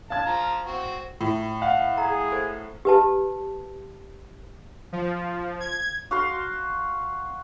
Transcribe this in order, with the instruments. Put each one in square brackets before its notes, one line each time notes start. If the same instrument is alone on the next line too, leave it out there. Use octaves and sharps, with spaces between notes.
[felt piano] F5 G#6 [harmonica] A5
[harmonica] F3 F4 A#5
C4 F#4
[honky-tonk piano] A2 [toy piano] F4
[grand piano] F5 F#5
[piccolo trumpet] G#4 [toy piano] A#5
[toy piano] A4 C5
G4 B4 A5
[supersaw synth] F3
G#6
[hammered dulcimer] F#4 F5 C6